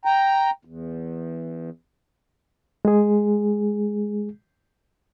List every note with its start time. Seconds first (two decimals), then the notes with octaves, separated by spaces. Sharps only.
0.05 G5 A#5
0.65 E2
2.85 G#3 G#4